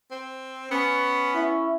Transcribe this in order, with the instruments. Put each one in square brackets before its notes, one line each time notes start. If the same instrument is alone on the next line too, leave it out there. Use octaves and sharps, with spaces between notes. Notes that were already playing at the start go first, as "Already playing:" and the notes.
[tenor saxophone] C4
[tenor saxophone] B3 [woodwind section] C#4
[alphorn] E4